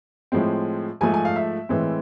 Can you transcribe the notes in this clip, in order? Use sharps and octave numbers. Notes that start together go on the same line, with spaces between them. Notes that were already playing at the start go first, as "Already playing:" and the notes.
A2 F3 G#3 C4
G#2 F3 A3 G#5
G#5
F5
E5
A2 E3 G#3 C4